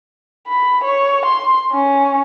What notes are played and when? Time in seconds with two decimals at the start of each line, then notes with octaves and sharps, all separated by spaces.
0.48 B5
0.84 C#5
1.25 C6
1.72 C#4